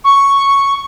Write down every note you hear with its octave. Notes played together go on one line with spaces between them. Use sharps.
C#6